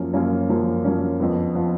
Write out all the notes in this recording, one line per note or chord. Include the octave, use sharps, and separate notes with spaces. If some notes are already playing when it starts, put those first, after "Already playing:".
Already playing: F#2 F3 A#3 C#4
F#2 F3 A#3 C#4
F#2 F3 A#3 C#4
F#2 F3 A#3 C#4
F2 F3 B3
F3 B3